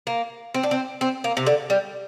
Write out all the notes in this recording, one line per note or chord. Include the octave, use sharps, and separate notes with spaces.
A#3
C4
D4
C4
C4
A#3
C3
D3
G3